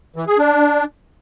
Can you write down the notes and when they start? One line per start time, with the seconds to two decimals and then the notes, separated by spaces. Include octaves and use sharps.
0.16 E3
0.27 G#4
0.38 D4